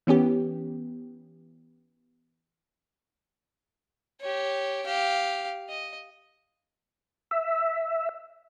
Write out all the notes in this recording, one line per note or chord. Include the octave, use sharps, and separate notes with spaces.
E3 B3 C#4 G4
G4 C#5
G4 F5
D#5
E5